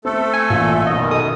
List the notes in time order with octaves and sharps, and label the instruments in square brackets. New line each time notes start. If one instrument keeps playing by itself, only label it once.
[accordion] A3 A4 [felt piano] C4
[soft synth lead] G#5
[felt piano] A1 A#2 [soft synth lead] G#5
[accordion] F#2 B2 D#3 [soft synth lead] D#5
[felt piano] A4 D#5 [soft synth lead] D#6